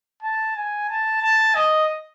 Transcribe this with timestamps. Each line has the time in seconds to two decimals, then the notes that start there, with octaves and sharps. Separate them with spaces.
0.23 A5
0.56 G#5
0.89 A5
1.22 A5
1.55 D#5